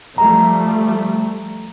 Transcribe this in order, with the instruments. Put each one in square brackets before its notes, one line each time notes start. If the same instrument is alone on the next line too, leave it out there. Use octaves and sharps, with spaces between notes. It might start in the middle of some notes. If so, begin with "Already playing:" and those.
[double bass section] F3 G3 A3 [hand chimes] A#5